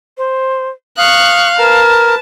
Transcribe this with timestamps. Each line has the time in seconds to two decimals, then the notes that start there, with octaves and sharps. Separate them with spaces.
0.18 C5
0.97 F5 C#6 D#6 F#6
1.59 A#4 B4 A5